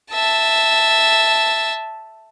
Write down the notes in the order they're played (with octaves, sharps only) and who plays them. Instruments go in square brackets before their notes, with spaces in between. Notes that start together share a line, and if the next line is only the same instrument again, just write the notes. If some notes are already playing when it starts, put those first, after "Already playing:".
[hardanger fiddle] E5 A5